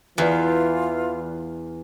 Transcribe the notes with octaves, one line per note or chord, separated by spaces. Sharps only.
E2 E3 F4 B4 D5